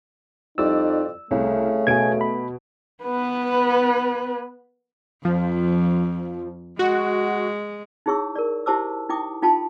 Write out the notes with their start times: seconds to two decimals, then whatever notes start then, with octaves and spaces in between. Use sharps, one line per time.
0.58 F2 G3 D#4 E4 D5 E6
1.31 C2 C#3 A3
1.87 B2 G#5 G#6 D7
2.21 B5
3.04 B3 B4
5.25 F2 F3
6.79 G#3 F#4
8.06 D#4 E4 G#4 C#5 C#6 E6
8.36 A#4 D5
8.66 E4 G4 C5 A5 D6 E6
9.09 D#4 E4 G5 D6 D#6
9.43 D#4 F4 G5 A5 C6